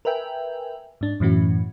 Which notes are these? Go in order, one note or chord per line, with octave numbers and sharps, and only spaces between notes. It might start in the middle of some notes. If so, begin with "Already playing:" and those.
A#4 B4 E5 G5 G#5
G#2 D4
F#2 A2 E3 C#4 F#4